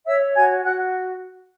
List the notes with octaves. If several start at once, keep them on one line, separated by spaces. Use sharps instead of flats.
C#5 E5 E6
F#4 G#5 G#6
F#4 F#5 F#6